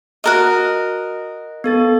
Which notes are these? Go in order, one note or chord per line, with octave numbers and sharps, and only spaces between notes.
F#4 A#4 D#5
B3 A4 A6